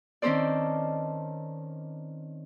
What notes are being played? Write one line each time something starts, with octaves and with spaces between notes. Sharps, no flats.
D#3 C4 C#4 A4 C5 D5